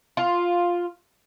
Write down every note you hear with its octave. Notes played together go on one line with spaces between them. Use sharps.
F4